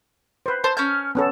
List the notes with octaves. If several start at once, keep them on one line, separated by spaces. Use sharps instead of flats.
B4 C5
C5 A5
C#4 F6 G6
B3 C#4 A4